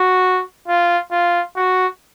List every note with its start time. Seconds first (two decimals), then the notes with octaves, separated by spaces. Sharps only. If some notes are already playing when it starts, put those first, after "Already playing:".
Already playing: F#4
0.68 F4
1.11 F4
1.56 F#4